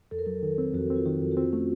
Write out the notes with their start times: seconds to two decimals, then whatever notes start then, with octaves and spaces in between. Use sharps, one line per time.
0.11 F2 A4
0.19 A#4
0.26 F#3 A4
0.43 D#3
0.58 C4
0.74 F2 F#4
0.90 C4
0.96 F4
1.05 D#3 F#4
1.22 F2
1.31 F#4
1.37 C4 F4
1.53 A3 C#4